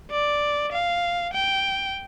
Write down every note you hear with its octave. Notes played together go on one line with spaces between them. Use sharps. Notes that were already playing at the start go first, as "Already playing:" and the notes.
D5
F5
G5